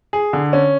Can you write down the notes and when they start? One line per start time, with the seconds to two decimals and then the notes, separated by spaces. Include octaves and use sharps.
0.13 G#4
0.33 D3
0.53 C#4